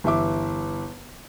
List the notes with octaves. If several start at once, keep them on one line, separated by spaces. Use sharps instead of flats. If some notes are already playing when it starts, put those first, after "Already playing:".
G1 E3 E5 D6